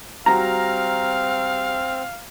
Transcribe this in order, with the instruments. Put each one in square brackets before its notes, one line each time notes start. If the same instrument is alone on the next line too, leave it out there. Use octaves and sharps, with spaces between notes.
[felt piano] G3 F#4 [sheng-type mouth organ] C4 F6 [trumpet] F5 [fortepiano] A#5